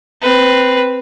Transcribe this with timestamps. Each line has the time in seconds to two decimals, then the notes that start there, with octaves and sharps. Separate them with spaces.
0.21 C4 B4